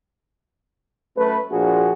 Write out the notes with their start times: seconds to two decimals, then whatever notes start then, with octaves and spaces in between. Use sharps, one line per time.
1.17 F#2 A3 B4
1.52 A#1 A#2 F3 F#4 G#4